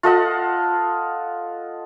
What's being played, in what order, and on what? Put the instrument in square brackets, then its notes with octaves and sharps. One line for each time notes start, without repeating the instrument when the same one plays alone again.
[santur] F4 A4 D#5 F#5